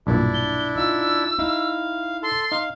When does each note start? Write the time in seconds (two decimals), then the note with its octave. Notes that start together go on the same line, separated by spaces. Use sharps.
0.07 B1 G2 A#2 D4 E4
0.34 G7
0.76 D#4 F4 E6
1.39 D#4 E4 F5
2.23 A4 C6
2.52 D#4 F5